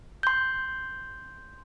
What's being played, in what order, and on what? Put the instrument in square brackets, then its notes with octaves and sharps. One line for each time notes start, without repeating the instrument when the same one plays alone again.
[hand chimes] C6 G6